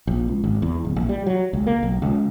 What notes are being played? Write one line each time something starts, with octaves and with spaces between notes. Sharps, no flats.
A#1
C#2
G#1
E2
D1
A#1
G3
F#3
C#2
A#3
B1
C#2